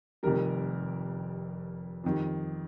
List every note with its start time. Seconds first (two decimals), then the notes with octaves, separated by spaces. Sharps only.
0.23 F1 F2 D#3 G3 A#4
2.04 F2 D#3 G3